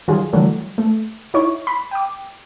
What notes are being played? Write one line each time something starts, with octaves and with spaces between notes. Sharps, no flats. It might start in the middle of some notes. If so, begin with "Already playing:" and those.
D#3 F#3 G3 F4 G#4
D3 E3 F#3 G3 A3
A3
D#4 E4 C#5 C#6
B5
G5 D6